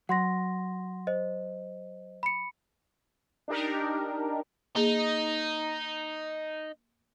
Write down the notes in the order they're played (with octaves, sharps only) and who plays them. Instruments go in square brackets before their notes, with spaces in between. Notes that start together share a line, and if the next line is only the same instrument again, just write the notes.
[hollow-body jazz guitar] F#3 [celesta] F#5 C6 A#6
[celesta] C5 D#5
B5 C#7
[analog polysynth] D4 D#4 G4 A#4
[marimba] A#3 G#4 [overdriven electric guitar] D#4